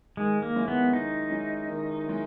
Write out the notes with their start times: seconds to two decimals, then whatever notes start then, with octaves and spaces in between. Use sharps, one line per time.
0.17 D#3 G#3
0.42 A#3
0.56 G#3 C#4 E4
0.68 B3
0.93 D#3 D#4
1.30 G#3 C#4 E4
1.68 D#3
2.05 G#3 C#4 E4